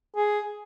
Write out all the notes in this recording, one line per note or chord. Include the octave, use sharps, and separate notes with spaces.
G#4